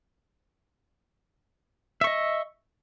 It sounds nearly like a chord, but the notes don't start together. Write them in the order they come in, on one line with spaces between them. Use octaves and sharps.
E5 C#6 D#5